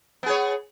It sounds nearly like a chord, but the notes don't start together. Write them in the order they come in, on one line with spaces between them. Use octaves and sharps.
B3 G#4 C#5